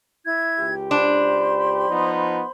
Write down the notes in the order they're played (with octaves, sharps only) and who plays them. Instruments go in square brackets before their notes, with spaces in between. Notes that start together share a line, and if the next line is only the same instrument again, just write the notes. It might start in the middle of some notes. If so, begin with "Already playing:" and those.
[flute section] E4 G#6
[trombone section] C#2 G4
[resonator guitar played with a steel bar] D4 [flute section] C5 B5 C6
[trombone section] F3 B3 D#4